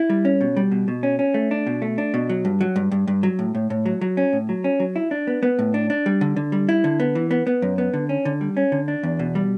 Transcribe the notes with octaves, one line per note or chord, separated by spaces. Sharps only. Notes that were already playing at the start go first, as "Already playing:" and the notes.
Already playing: E4
G3
C#4
B2
G3
B2
B2
C#4
C#4
A3
D4
B2
A3
D4
B2
F#3
G2
F#3
G2
G2
G2
F#3
A2
A2
A2
F#3
F#3
C#4
A2
F#3
C#4
F#3
E4
D4
B3
B3
A2
D4
D4
G3
D3
D3
G3
E4
D3
B3
E3
B3
B3
F#2
B3
D3
C#4
D3
G3
C#4
D3
D4
E2
B2
G3